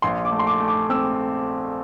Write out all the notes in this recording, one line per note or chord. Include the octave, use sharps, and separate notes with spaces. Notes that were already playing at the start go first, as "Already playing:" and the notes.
A#1 C6
D6
A3
C6
D6
A3
D6
C4 E6